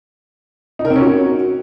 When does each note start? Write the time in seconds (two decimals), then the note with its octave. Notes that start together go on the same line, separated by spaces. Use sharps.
0.79 D#4
0.85 A#4
0.90 C4
0.96 C#4
1.01 F#4